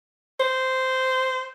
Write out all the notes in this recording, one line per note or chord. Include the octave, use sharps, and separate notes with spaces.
C5